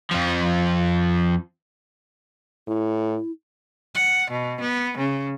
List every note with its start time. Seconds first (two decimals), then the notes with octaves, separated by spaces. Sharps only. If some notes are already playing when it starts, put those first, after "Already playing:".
0.11 F2 F3
2.68 A2 E4
3.95 F#5
4.30 B2
4.61 B3
4.97 C#3